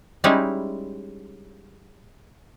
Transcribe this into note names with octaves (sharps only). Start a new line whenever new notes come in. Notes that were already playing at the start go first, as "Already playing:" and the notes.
G3 G#3 C#4 D#4 E4